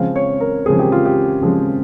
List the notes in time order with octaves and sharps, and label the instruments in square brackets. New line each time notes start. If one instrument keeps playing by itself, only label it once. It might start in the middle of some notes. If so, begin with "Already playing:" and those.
Already playing: [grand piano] C#3 F3 G#3 C4 F5
C#5
A#4
C#3 F3 G#3 C4 G#4
G4
F4
G4
C#3 F3 G#3 C4